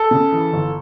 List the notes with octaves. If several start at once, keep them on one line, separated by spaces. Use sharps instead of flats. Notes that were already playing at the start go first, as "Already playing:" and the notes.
Already playing: A4
C#3
E3
G1